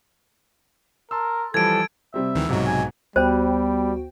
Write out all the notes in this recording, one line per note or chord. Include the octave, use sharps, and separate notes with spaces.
A#4 A5 C6 E6
E3 F3 G3 A4 A5 G#6 D7
C3 G3 C4 E5
D2 D#3 E3
B1 G#2 C3 F#3 F#4
G#5
D2 G3 B3 F#4 C5 G5